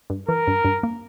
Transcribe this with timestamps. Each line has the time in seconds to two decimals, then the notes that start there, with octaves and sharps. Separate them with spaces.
0.10 G2
0.29 E3 A#4
0.47 G2
0.65 G2
0.83 A#3